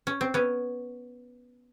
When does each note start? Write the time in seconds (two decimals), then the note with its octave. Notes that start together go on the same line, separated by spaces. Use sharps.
0.07 C#4
0.21 C4
0.34 B3 C#4